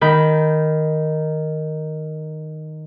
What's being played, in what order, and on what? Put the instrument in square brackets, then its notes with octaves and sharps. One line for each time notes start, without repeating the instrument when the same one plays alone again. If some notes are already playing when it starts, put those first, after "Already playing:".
[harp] D#3 B5 G6